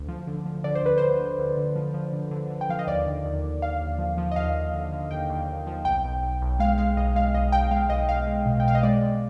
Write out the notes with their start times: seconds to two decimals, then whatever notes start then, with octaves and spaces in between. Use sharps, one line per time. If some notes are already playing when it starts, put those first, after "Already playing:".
Already playing: D2
0.08 F3
0.27 D3
0.46 F3
0.64 D3 D5
0.75 C5
0.83 D2 B4
0.98 D3 C5
1.20 D2
1.39 D2
1.57 D3
1.76 F3
1.94 F3
2.13 D3
2.31 D3
2.50 D3
2.61 G5
2.69 F3 F5
2.79 D#5
2.87 D#2 D5
3.06 D3
3.25 D#2
3.43 D#2
3.62 D#2 F5
3.81 D#2
3.99 F3
4.18 F3
4.31 D#5
4.36 D#2 F5
4.54 D#2
4.74 D3
4.92 D3
5.11 D#2 G5
5.30 D#2
5.48 D#2
5.67 F3
5.85 B1 G5
6.04 B1
6.22 B1
6.41 B1
6.60 G#3 F5
6.78 G#3 F5
6.97 B1 D#5
7.16 G#3 F5
7.34 B1 D#5
7.52 B1 G5
7.71 G#3 F5
7.90 B1 D#5
8.09 B1 F5
8.27 G#3
8.46 B2
8.60 G5
8.64 B2 F5
8.75 D#5
8.83 G#3 D5
9.02 G#3